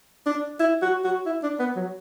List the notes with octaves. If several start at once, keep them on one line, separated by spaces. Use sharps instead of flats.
D4
E4
F#4
F#4
E4
D4
B3
F#3